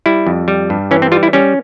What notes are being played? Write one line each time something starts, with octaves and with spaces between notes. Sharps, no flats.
G3 E4
F2
G3
G2
E3 C#4
C4
G3 F4
E4
G3 C#4